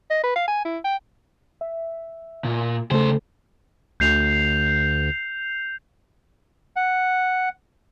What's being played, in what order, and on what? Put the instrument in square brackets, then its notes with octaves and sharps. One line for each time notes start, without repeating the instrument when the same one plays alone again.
[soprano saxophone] D#5
B4
F5
G#5
E4
G5
[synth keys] E5
[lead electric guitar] A#2
[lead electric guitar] C#2 C5 [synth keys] C#3 A3 A4
[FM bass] D2 [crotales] G6 C7 F7
[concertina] F#5